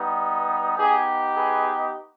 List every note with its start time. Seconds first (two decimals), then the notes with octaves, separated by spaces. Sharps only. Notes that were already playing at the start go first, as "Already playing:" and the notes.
Already playing: G3 B3 D#4
0.78 B3 D#4 G4 G#4
1.37 G#4 B4